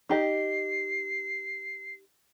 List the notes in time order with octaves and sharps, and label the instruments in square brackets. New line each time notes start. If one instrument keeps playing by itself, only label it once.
[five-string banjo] D#4 G4 D#5 [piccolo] C7